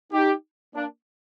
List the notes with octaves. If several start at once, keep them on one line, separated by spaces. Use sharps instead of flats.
D#4 G4
A#3 D4